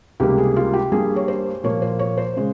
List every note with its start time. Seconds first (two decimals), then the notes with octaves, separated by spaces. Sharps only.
0.20 C#2 C3 G3 A#3 G4
0.38 G#4
0.56 F4
0.74 G4
0.92 G2 G3 A#3 G#4
1.16 C#5
1.28 C5
1.64 A#2 F3 A#3 C#5
1.82 C5
1.99 C#5
2.18 C5
2.37 C#3 G#3